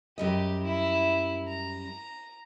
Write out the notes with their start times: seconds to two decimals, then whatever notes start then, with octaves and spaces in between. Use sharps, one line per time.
0.18 F#2 G3 G4 D#5
0.63 E4
1.48 A#5